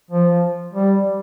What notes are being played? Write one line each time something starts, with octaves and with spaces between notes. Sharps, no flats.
F3
G3